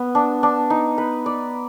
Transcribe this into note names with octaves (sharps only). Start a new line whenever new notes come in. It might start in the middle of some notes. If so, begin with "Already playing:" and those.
Already playing: B3
D4
D4
D#4
B4
D5